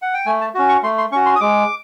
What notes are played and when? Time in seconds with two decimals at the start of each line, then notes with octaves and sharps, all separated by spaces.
0.02 F#5
0.14 G5
0.26 A3 G#5
0.41 A5
0.54 C#4 F#4
0.69 C#6
0.83 A3 C6
0.98 C6
1.12 C#4 C#6
1.15 F#4
1.26 C6
1.35 D#6
1.41 G#3 D6